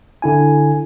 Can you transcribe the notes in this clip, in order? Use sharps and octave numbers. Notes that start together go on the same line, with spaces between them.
D3 E4 G#5